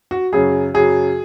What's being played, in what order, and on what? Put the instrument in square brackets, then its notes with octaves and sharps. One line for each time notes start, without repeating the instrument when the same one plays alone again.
[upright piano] F#4
F#2 C#3 F#3 G#4
F#2 C#3 F#3 G#4